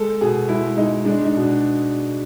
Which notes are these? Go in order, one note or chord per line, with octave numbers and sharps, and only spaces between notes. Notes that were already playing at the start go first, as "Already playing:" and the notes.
Already playing: G#3 A4
B2 G#4
G#3 E4
G#3 D#4
G#3 D4
D#4
B2
D4